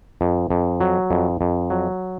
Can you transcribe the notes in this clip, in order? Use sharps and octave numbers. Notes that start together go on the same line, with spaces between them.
F2
F2
F#3
F2
F2
F#3